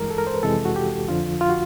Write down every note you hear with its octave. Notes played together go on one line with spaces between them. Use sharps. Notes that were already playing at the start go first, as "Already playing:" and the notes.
Already playing: G2 E3 G#3 A#4
A4
A#4
C5
B4
F2 C3 E3 G#3 A4
F#4
G4
F2 D3 F3 F4
F4
F#4